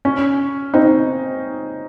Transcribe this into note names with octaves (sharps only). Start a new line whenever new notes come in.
C#4
C4 D#4